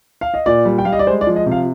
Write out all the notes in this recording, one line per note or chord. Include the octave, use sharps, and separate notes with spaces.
F5
D#5
A#2 D5
G3
G5
G3 F5
D#5
D5
G#3 C5
D5
F3
D#5
C3
F5